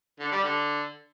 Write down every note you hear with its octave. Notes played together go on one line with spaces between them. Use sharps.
D3
G3
D3